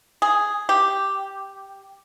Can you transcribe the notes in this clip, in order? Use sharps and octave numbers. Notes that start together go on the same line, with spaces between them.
G#4
G4